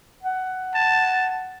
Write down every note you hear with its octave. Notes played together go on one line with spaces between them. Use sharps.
F#5
A5